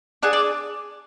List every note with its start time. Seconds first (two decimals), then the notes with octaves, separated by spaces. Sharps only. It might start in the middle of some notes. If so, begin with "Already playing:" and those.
0.23 D4 G#4 F#5
0.33 D5